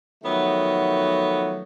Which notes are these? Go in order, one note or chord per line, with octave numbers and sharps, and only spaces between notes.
D#3 F3 F#3 A3 B3